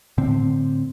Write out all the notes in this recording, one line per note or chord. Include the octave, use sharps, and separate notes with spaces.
A2 D3 C4